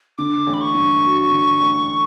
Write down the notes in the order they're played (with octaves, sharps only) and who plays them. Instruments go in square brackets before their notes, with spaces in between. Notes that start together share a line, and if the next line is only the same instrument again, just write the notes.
[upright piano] D3 [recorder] D6
[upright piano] A1
[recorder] B5
C#6
[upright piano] G2
F#3
D3
A1